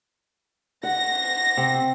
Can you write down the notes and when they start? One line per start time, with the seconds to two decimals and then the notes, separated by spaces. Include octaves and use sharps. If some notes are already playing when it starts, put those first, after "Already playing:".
0.83 F#5 A#6
1.57 C3 C4